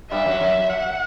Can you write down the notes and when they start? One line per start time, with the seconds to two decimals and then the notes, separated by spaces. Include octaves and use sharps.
0.11 G2 G3 E5
0.26 F#2 F#3
0.40 F#2 F#3
0.70 F#5